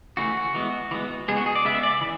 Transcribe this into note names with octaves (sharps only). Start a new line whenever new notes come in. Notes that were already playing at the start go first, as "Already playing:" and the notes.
C#3 E3 A3 C#4 F#4
E3 G#3 B3
E3 G#3 B3
C#3 G#3 B3 G#4
F#4
G#4
D5
C#3 G#3 B3 E5
E5
D5
E3